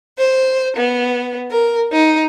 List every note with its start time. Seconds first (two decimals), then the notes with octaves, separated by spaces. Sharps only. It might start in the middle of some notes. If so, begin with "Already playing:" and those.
0.17 C5
0.76 B3
1.51 A#4
1.91 D#4